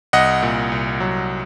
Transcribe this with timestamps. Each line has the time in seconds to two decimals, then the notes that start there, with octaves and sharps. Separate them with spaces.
0.13 C2 D#5 F#5
0.42 A#2
0.72 C2
1.00 F#3